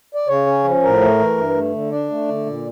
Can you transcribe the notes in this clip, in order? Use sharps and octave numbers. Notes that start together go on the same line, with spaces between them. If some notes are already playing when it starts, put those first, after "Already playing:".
D5
C#3 C#5
C#4
F3
A2 A#4
A3
E3
G2
A3
D3
D4 D5
A3
D3
A#2